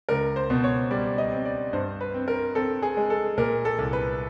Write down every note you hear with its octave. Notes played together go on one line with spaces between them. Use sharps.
C#2 A#4
C5
B2
C#5
G3 D5
D#5
C4
D5
G2 C5
B4
C4
A#4
C4 A4
G#4
G#3
A4
A#2 A#4
A4
C2
B4